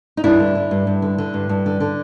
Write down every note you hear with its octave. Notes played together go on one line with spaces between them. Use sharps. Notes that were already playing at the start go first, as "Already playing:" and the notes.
D#4
G2 D4 E4
D3
D3
G2
G2
D3
D3
G2
G2
D3
D3